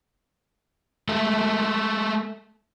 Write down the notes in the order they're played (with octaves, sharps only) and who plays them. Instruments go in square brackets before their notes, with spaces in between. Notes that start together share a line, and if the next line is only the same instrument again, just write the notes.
[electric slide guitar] G#3 A3 A4 E5